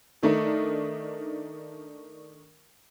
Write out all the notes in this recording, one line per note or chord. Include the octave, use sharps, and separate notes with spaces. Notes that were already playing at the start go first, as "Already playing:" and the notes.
D#3 A3 D4 D#4 A#4